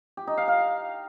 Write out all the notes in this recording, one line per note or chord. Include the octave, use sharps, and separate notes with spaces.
G4
D#4
F5
F5